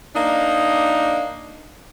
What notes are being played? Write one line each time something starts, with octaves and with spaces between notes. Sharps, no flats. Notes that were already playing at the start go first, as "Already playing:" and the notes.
A#3 D4 D#4